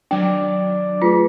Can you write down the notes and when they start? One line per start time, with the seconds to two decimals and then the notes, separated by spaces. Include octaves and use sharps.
0.11 D#3 F#3 D4 D5 G5
1.02 A3 F4 G#4 B4